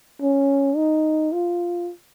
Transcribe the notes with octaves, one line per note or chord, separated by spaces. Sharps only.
C#4
D#4
F4